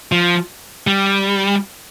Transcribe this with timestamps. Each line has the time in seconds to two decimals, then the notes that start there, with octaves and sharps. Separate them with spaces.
0.12 F3
0.87 G3